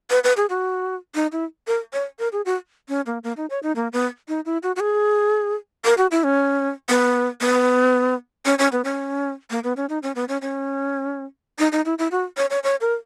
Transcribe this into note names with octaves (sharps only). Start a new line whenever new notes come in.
B4
B4
G#4
F#4
D#4
E4
A#4
C#5
A#4
G#4
F#4
C#4
A#3
A#3
D#4
C#5
D#4
A#3
B3
D#4
E4
F#4
F#4
G#4
A#4
F#4
E4
C#4
B3
B3
C#4
C#4
B3
C#4
A#3
B3
C#4
D#4
C#4
B3
C#4
C#4
D#4
D#4
E4
E4
F#4
C#5
C#5
C#5
A#4